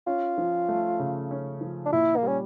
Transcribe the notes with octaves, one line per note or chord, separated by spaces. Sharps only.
C#4 F4
F3
A3
C#3
C#4
F3
D4
A#2 E4
A#3
G3 C#4